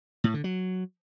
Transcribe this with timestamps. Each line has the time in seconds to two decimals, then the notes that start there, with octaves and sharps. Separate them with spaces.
0.24 A2
0.34 D3
0.44 F#3